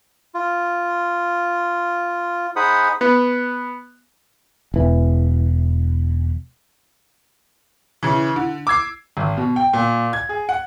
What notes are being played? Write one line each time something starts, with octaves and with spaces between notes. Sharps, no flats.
F4
D#4 G#4 C5 F#5 B5 D#6
B3
E1 E3
C#3 E3
D3
D6 E6 G#6 C7
G#1
B2
G5
A#2
G#6
G#4
F#5